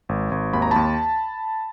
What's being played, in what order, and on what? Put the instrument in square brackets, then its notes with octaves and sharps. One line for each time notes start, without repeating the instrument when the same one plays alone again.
[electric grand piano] G#1
G#1
D#2 B5
A#5
D#2 A5 B5